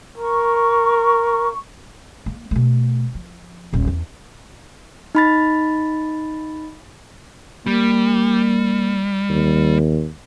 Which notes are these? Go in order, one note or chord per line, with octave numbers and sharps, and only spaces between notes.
A#4 C#6
A#3
B2 A3
F3
D#1 A#1
E2
D#4 B5 A6
G3 A#3
D#2